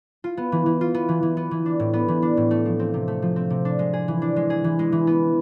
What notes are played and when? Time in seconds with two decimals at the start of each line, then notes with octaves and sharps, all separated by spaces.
0.24 F4
0.37 B3
0.52 E3
0.66 E3
0.81 F4
0.94 B3
1.09 E3
1.23 E3
1.37 B3
1.51 E3
1.66 D4
1.80 A2
1.94 B3
2.08 E3
2.22 D4
2.37 A2
2.51 A3
2.65 F3
2.79 C4
2.94 C3
3.08 A3
3.22 F3
3.36 C4
3.50 C3
3.65 D4
3.79 G#3
3.93 G#4
4.08 E3
4.22 D4
4.36 G#3
4.50 G#4
4.64 E3
4.79 G#3
4.92 E3
5.07 B3